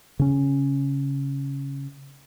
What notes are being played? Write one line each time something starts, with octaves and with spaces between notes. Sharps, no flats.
C#3 C#4